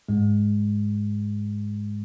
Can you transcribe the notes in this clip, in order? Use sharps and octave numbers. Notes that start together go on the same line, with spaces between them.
G#2 G#3